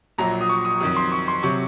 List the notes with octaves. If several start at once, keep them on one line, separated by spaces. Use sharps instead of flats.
A#1 A#2 F#3 A#5
D#6
C#6
D#6
F2 D#3 F#3 D#6
C6
C#6
C6
C3 F#3 C#6